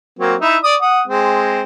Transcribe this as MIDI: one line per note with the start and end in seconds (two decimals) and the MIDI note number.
0.19 0.35 54
0.19 0.35 58
0.19 0.35 60
0.41 0.57 63
0.41 0.57 64
0.41 0.57 76
0.63 0.75 74
0.63 0.75 87
0.82 1.01 78
0.82 1.01 87
1.08 1.62 56
1.08 1.62 60